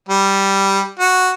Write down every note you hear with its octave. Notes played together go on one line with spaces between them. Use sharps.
G3
F#4